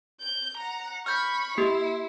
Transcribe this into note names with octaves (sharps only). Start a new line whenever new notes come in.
G6
F#5 A#5
B5 C#6 F6 G6
A#3 E4 G4 C7